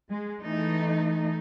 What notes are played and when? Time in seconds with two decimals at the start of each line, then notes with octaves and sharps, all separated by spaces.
0.10 G#3
0.42 E3 A3 D#4